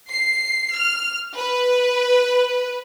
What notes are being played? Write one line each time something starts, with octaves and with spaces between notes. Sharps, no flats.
C7
F6
B4